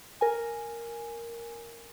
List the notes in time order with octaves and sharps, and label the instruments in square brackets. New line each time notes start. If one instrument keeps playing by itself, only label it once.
[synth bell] A#4 G#5